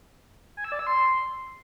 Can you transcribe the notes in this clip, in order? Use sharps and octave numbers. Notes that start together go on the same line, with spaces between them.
G#5
E6
D5
E6
C6